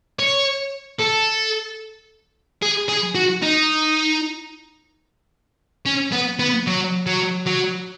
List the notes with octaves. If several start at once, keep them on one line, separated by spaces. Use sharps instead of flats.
C#5
A4
G#4
G#4
F#4
D#4
C#4
B3
B3
F#3
F#3
F#3